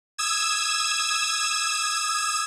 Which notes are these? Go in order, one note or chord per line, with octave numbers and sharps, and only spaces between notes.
D#6 E6 G#6 E7